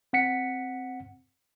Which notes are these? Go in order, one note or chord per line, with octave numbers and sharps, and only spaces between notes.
C4 F#5 B6 C#7